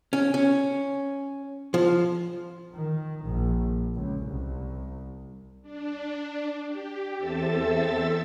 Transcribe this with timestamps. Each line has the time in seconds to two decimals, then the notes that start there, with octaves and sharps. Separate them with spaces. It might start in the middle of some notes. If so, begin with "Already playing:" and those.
0.13 C#4
0.34 C#4
1.74 F3
2.75 D#3
3.24 A#1
3.94 C#2
4.25 C2
5.62 D4
6.67 G4
7.18 E2 C4 A4 E5 E6 A6